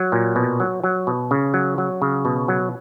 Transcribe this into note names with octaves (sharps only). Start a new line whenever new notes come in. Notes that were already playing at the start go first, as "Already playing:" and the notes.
Already playing: F#3
A#2
B2
F#3
F#3
B2
C#3
F#3
F#3
C#3
B2
F#3